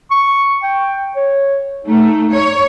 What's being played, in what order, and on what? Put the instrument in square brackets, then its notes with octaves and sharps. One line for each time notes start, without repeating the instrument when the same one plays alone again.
[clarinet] C#6
G5
C#5
[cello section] A3 [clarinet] D#4
[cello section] C#5